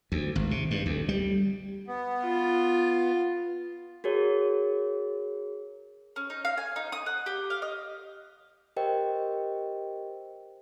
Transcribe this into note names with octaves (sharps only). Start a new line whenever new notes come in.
D2
G#1
C3
G2
D2
G3
B3
F4
F#4 G#4 A#4 C#5
C#4
D#4
F5
G#5
D#4
D#6
F#5
G4
F5
D#5
G4 A#4 C5 D#5 G5